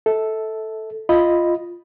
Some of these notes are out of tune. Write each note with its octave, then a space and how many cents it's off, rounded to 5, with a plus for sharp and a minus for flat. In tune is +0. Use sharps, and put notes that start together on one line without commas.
A4 +0 E5 -35
F4 -5 D#5 +0 B5 +0